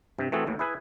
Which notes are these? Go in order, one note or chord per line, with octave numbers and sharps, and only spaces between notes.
G2 C3
E3 A3 C4 F#4 G#4 A4
A1 D#2 A2 E3
E4 G#4 B4 G#5